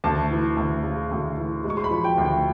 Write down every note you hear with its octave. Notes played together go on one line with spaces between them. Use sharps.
D2 A5
E3
D2
C#3
D2
E3
G#3
C#6
C6
B5
F3
G5
D2
G5